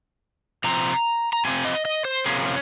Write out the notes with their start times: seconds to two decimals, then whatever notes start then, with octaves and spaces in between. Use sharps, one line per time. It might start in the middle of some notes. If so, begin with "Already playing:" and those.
0.64 C3 F3 C4 A#5
1.33 A#5
1.45 C3 F3 C4 G#5
1.65 D#5
1.85 D#5
2.05 C5
2.26 C3 F3 A#3 C#4 G#4
2.46 C#4